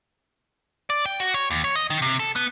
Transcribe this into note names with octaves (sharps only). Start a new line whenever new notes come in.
D5
G5
F#4
C#5
D#2
C#5
D#5
D#3
C3
A4
B3